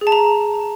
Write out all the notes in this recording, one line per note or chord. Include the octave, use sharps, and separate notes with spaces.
G#4
A5
A#5